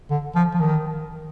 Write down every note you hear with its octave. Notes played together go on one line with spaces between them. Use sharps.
D3
F3
F3
D#3